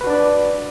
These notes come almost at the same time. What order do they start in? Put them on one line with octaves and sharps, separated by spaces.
B4 F#4 D4 D5